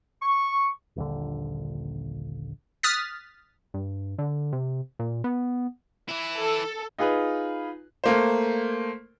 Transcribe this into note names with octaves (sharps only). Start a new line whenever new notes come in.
C#6
D#1 A#1 D3
D#6 F6 F#6 A6 B6
G2
D3
C3
A#2
B3
E3 E4
A4
D#4 F4 G#4 B4
A3 A#3 C5